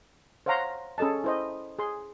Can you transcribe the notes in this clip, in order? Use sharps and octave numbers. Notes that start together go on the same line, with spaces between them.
C5 C#5 F5 F#5 A#5 C6
C#4 G#4 A4 D#5 A5
E4 C5 D#5
G#4 C6